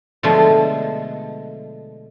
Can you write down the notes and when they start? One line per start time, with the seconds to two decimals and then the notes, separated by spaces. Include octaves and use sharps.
0.23 B2 D3 F3 G#3 A3